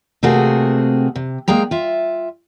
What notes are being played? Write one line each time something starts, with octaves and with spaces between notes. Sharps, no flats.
C3 A3 A#3 C4 F#4 G#4
C3
G#3 A#3 G#4 G5 A#5
F4 E5